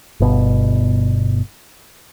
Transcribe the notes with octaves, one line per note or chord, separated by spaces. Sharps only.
G1 B2